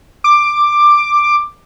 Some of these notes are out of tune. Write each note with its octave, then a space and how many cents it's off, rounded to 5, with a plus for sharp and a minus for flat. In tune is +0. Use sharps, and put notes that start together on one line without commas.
D6 +10